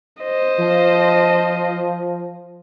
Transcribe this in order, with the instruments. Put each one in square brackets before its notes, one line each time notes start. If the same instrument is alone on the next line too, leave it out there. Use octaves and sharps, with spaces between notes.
[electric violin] C5 D#5
[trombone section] F3